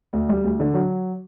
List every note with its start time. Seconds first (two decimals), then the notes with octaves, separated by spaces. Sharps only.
0.13 D2
0.29 G3
0.44 D2
0.60 D3
0.74 F#3